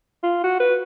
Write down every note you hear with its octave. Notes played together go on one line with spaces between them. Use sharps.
F4
F#4
B4